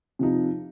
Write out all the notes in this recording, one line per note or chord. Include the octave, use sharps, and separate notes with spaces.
C3 F3 D#4